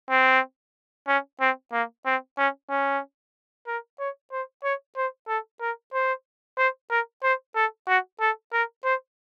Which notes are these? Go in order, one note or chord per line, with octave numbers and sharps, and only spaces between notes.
C4
C#4
C4
A#3
C4
C#4
C#4
A#4
C#5
C5
C#5
C5
A4
A#4
C5
C5
A#4
C5
A4
F#4
A4
A#4
C5